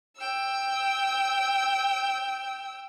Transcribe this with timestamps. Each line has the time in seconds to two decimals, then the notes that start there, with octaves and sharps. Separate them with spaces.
0.17 G5 E6